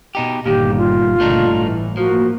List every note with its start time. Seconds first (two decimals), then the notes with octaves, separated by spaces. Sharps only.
0.15 B2 D#4 G4
0.46 G1 A#2 D#3 G4
0.78 F4
1.20 G1 A#2 C#3 A3 D4 D#4
1.55 A2 E3
1.97 F3 A#3 F#4